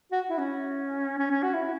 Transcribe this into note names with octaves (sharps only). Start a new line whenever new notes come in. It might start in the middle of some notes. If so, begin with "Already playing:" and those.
F#4
E4
C#4
C#4
C#4
F#4
E4